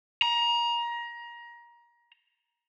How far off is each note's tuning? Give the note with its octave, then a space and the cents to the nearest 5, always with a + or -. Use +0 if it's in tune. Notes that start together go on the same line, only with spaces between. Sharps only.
A#5 +25